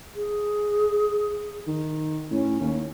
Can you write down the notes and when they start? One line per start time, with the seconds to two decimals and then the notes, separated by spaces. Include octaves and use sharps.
0.15 G#4
1.67 D#3
2.31 A2 C#4
2.60 D#2